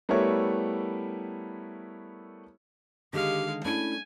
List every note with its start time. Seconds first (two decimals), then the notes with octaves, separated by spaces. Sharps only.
0.09 G3 A3 B3 E4 A#4 C#5
3.13 D3 D#3 G#3 G4 F5
3.65 A3 C#4 D4 E4 G#5